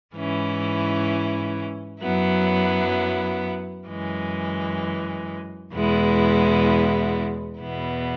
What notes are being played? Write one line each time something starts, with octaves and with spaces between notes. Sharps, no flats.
G#2 E3 C#4 E4
F#2 F#3 B3 E4
F#2 E3 G#3
E2 B2 G#3 B3 E4
E2 B2 B3 E4